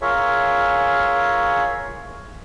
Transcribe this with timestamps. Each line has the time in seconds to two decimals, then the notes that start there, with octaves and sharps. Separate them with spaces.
0.02 F4 G#4 A#4 C#5 E5